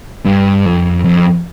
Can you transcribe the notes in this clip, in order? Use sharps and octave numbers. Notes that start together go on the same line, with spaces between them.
G2
F2
F2